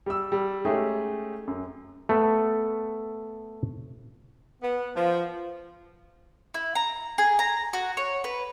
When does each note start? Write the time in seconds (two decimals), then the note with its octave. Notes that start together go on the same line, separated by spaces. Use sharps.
0.06 G3 E6
0.32 G3
0.65 G#3 A3 C#4 D#4 G4 G#4
1.47 F#2
2.09 A3 B3 A4
4.62 B3
4.95 F3
6.54 E4
6.75 A#5
7.18 G#4
7.39 A#5
7.73 F#4
7.97 C#5
8.24 B4